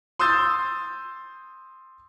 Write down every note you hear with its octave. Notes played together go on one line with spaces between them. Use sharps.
C6 D#6 E6 G6 A6